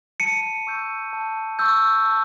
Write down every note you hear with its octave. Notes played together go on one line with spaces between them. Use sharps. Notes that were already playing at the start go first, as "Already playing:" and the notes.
A5 C#7 D#7
C#6 E6 G6
A5
C#6 E6 G6
A5